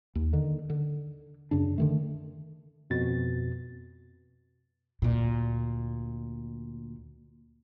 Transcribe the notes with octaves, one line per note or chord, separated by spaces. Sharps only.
D#2
D3 D#3
D3
F#2 C#3 D4
D3 D#3 A3
F2 B2 A6
D2 A#2